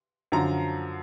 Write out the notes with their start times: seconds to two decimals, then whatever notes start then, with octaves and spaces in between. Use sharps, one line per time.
0.32 F#2 D3 F3 A#5